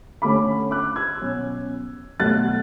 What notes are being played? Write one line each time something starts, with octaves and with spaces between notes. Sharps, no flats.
D3 A3 C#4 B5 D6
D6 F#6
E6 G#6
B2 F#3 C#4
B2 F#3 A3 F#6 A6